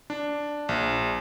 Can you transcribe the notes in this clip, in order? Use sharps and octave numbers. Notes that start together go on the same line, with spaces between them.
D4
A#1